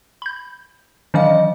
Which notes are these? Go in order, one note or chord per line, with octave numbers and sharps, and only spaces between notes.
B5 G6
D#3 E3 F#3 C#4 D4 D#5 F5